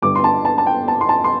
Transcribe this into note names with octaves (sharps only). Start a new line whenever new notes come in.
G1 G2 D3 G3 D6
C6
A5
A5
A5
G5
A5
C6
A5
C6